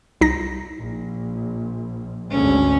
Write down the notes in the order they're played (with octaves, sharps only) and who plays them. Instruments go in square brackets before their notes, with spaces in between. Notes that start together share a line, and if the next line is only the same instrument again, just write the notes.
[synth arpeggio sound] C2 D#4 A#6
[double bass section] A#1
[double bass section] G#1 D2 G#3 [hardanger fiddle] C#4